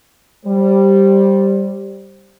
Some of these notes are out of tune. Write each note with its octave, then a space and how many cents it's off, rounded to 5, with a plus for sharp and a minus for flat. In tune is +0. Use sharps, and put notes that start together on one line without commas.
G3 +0 C5 +15